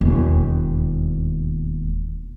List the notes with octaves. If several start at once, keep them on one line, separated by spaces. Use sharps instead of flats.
E1 D#2